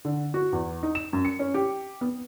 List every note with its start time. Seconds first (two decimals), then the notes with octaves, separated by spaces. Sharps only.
0.05 D3
0.34 F#4
0.53 E2
0.83 D#4
0.95 E7
1.13 F#2
1.25 C#7
1.39 C#4
1.54 G4
2.01 B3